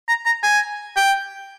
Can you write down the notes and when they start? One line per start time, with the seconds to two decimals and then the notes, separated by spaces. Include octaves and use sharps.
0.08 A#5
0.26 A#5
0.43 G#5
0.97 G5